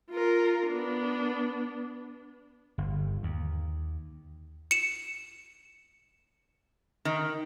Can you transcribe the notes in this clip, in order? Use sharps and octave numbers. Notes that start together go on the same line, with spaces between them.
F4 A#4
B3 D4
G1
D#2
C#7 E7
D#3